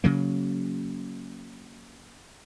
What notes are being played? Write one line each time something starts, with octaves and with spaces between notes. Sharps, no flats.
C#3 F#3 A#3